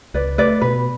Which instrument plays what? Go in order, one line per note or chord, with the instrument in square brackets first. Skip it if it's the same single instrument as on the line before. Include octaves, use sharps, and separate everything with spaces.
[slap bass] C#2 [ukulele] B4 D5
[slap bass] A3 [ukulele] B4 D5
[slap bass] B2 [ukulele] B4